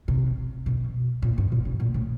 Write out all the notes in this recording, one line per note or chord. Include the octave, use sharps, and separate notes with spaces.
C3
B2
A#2
G#2
A#2
B2
A#2
A2